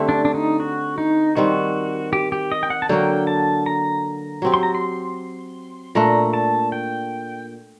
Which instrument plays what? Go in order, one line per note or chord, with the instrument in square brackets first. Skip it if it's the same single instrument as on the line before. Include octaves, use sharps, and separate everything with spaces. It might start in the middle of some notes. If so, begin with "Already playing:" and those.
Already playing: [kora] D3 A3 C4 G4
[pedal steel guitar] D4
D4
D#4
F#4
D#4
[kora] D#3 G3 C4 [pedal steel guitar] F#4
[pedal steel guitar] G4
G4
D#5
G5
F#5
A5
[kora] D3 F#3 A#3 F#4 [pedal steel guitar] G5
[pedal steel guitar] A5
A#5
[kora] F#3 C4 G4
[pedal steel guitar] C6
A#5
C6
[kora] A#2 A3 D4 [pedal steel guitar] A#5
[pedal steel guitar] A5
G5